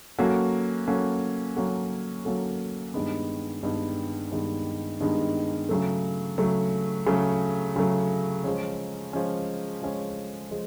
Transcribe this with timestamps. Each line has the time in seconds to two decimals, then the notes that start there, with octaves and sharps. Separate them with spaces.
0.19 F#3 A#3 C#4 F#4 A4
0.87 F#3 A#3 C#4 F#4 A4
1.56 F#3 A#3 C#4 F#4 A4
2.25 F#3 A#3 C#4 F#4 A4
2.94 G2 D#3 G#3 B3
3.63 G2 D#3 G#3 B3
4.31 G2 D#3 G#3 B3
5.00 G2 D#3 G#3 B3
5.69 C#3 F#3 A3
6.38 C#3 F#3 A3
7.07 C#3 F#3 A3
7.76 C#3 F#3 A3
8.44 F3 G#3 C#4
9.13 F3 G#3 C#4
9.82 F3 G#3 C#4
10.51 F3 G#3